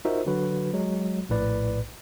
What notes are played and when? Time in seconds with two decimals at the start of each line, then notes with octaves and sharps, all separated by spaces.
0.05 D#4 F4 F#4 A#4 C5 E5
0.26 D3 F#3 F#4 B4
0.73 F#3 G#3
1.29 A#1 A2 B4 D5